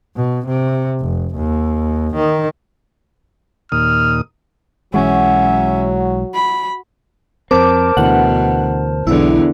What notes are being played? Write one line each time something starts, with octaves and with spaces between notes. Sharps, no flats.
B2
C3
F1
D#2
D#3
D#2 A#2 D#6 F6
B1 E3 F#3 G#3 C#4 F#4 E5
B5
F2 C4 A#4 C5 A5 D6
D2 B2 D3 E3 F#5
B1 E2 D3 E4